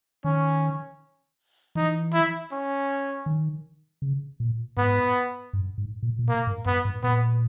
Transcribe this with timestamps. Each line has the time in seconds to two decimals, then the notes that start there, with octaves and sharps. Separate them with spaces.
0.24 D#3 C#4
1.75 E3 D#4
2.13 E4
2.52 C#4
3.26 D#3
4.02 C#3
4.40 A#2
4.77 G#2 B3
5.53 G2
5.78 G#2
6.03 A#2
6.19 A#2
6.28 B2 A#3
6.47 G#2
6.66 G2 B3
6.85 G#2
7.03 A#2 B3